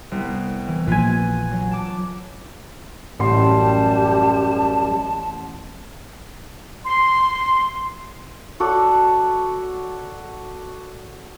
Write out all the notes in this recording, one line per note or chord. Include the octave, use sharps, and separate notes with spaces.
C2 B3
E3
A#1 F4 B4 G#5
F#3
A5 D6
A1 F#2 G3 G4 A5 C6 C7
C6
F#4 A4 C#5 D5